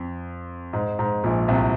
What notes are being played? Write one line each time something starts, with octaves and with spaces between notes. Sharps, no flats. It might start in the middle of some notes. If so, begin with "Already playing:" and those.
Already playing: F2
G#2
G#2
A#1 A#2
C2 C3